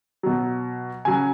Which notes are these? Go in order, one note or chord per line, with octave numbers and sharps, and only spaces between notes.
B2 F#3
C#3 F#3 G#5